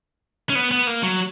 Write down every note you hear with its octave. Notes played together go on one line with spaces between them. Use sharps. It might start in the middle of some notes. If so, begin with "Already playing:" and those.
C#4
B3
B3
A#3
F#3